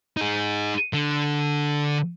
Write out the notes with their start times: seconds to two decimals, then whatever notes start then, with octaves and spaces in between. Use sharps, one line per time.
0.17 D#4 G#4
0.93 D3